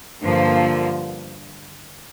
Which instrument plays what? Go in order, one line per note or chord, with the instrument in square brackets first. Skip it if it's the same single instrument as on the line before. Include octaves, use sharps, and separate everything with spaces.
[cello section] G2 D3 F3 A#3